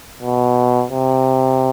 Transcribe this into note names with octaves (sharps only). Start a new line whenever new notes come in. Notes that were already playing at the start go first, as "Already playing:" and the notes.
B2
C3